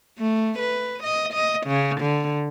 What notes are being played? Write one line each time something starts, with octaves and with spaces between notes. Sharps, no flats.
A3
B4
D#5
D#5
C#3
D3